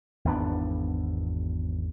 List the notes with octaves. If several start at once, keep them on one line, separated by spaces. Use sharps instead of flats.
G#1 E2 B3 D4